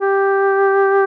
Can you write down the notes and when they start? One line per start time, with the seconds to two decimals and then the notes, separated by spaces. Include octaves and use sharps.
0.01 G4